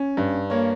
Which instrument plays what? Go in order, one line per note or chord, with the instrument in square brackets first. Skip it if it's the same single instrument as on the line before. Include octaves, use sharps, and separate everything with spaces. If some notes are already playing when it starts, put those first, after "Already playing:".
Already playing: [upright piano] C#4
G2
A#3 C#5